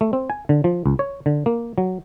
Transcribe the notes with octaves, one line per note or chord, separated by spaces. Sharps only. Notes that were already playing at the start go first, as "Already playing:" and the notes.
A3
C4
G#5
D3
F3
C#2
C#5
D3
A#3
F#3